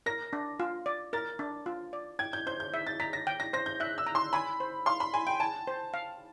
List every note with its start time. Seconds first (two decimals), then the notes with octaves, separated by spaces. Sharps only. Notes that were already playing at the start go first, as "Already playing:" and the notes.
0.06 A#4 A#6
0.33 D4
0.60 F4
0.86 D5
1.13 A#4 A6
1.39 D4
1.66 F4
1.93 D5
2.19 G5 G#6
2.33 G6
2.47 C5 G6
2.60 G6
2.74 E5
2.87 A6
3.00 A#5 B6
3.13 A#6
3.27 G5
3.40 A#6
3.53 C5 A#6
3.66 G6
3.80 E5 F#6
3.98 E6
4.07 A#5
4.15 C6
4.33 G#5 B5
4.60 C5
4.86 F5 C6
5.00 B5
5.14 G#5 C6
5.27 G5
5.40 G#5 A5
5.67 C5
5.94 F5